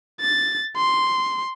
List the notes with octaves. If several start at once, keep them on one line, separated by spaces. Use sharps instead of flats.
A6
C6